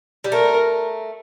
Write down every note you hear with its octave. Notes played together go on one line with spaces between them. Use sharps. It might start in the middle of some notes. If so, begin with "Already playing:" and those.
G3
A3 A#4